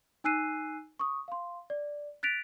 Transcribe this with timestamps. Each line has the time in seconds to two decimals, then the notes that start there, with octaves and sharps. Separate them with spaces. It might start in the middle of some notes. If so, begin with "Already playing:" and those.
0.24 D#4 G#5 E6 F#6 C7 D#7
1.00 C#6 D#6
1.28 F5 C6
1.70 D5
2.23 F#6 A6 B6 D7 F7